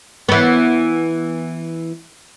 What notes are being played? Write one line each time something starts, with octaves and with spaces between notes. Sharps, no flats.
E3 B3